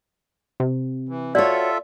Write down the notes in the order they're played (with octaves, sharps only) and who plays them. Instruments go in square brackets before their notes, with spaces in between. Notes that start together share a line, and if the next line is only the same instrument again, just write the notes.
[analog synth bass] C3
[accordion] E3
[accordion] F4 A4 E5 [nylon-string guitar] F#4 C#5 [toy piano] D5